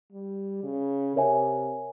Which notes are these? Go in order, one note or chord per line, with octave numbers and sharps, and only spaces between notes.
G3
C#3
C3 A#4 C#5 E5 G#5